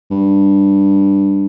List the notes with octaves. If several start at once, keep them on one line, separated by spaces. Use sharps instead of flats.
G2